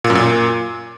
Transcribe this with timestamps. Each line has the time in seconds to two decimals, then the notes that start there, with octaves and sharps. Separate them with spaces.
0.04 A#2
0.10 F#2
0.15 A#2